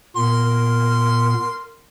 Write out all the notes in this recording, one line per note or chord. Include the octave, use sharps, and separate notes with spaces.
A#2 B3 A#4 C6